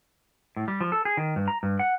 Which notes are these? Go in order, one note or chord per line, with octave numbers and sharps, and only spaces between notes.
A2
G3
F3
A4
G#4
D#3
G2
A#5
G2
F#5